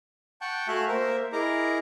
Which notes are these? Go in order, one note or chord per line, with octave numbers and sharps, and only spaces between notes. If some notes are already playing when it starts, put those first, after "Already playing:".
F#5 G5 A5 C#6 G6
A3 F#4 E5 F5 G#5 F#6
A#3 A#4 C5 E5
E4 G#4 A#4 D#5 A#5 D6